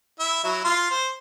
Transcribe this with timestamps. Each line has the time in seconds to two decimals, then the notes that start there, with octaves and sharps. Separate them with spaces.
0.19 E4 E5
0.44 F#3 E4
0.65 F4 C6
0.91 C5